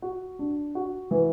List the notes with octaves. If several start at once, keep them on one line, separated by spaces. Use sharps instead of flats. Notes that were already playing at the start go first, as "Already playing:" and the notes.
F#4
D4
F#4
E3